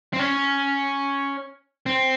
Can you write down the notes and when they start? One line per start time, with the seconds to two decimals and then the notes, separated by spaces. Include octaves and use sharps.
0.13 C4
0.19 C#4
1.86 C4